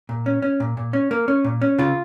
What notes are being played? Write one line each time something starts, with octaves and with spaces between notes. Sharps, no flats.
A#2
C#4
C#4
A#2
A#2
C#4
A#3
C#4
A#2
C#4
C#3 F4